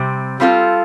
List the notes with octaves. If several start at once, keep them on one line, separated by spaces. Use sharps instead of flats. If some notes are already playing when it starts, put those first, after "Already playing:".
Already playing: C3 G3 C4
G3 C4 F4 A4